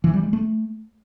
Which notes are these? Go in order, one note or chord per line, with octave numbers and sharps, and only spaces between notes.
E3
G3
G#3
A3